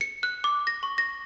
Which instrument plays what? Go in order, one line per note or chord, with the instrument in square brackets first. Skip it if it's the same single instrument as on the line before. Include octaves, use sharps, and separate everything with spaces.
[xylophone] C#7
F#6
D6
A#6
C#6
A#6